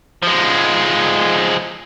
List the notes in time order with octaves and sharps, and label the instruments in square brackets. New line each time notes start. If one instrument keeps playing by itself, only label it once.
[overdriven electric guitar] F3 G#3